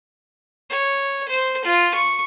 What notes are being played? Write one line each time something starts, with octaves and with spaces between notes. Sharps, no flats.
C#5
C5
F4
C#6